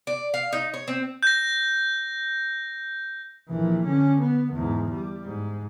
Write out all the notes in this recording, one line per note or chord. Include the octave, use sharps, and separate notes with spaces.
D5
F5
D#4
C#5
C4
G6 A#6
A#1 E3
D3 C#4
B3
E2 G#2
G3
G#2